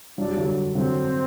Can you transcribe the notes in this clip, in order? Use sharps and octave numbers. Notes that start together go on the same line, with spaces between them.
F#3 D4
G3
D3 F#3
D3 F#3 C4